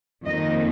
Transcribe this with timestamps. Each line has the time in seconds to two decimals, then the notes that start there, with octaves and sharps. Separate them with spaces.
0.25 F2 D#3 A#3 D#4 D#5